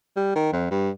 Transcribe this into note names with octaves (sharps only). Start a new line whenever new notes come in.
G3
D#3
F2
G2